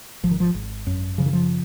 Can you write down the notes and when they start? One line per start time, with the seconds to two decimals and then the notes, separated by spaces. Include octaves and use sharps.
0.23 G#1 F3
0.31 D#3
0.40 F3
0.55 G#1
0.87 F#2
1.18 C#3 F3
1.26 D#3
1.33 F3